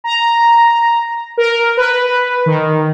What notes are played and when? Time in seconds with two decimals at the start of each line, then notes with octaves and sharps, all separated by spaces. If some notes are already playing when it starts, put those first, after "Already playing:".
0.04 A#5
1.37 A#4
1.77 B4
2.46 D#3